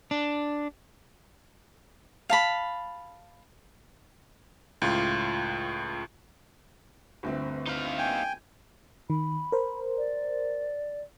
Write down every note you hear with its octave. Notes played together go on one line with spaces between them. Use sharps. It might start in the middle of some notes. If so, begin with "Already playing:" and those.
D4
F5 A5 B5
C#2 A2 F4
G1 D2 C4
D#4 F5
G5 G#5
D#3 B5
A#4 C5
D5